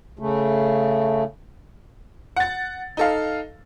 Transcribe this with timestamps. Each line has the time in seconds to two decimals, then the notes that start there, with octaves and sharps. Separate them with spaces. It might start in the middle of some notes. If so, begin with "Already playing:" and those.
0.19 C#3 A3
2.36 F#5 A6
2.97 D#4 A4 F5